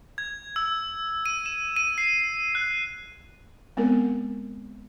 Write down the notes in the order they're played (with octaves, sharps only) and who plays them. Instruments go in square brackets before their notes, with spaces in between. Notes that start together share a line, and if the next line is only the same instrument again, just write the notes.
[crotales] G#6
E6
D#7
E7
D#7
C7
F#6
[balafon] G#3 B3 C4 A#4